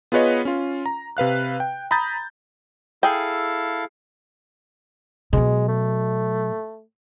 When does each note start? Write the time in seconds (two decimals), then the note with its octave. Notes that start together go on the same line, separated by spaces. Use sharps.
0.12 B3 F4 G#4 B4 C#5 D#5
0.45 C#4 F4
0.86 A#5
1.17 C3 B4 F5 F#6
1.60 G5
1.91 A#5 B5 D#6 G6 A6
3.03 E4 G#4 A4 F5 G5
5.33 B2 F#3 G#3
5.68 A3